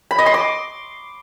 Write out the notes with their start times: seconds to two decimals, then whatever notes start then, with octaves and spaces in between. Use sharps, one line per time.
0.11 B5
0.18 D#5
0.26 C6
0.34 D6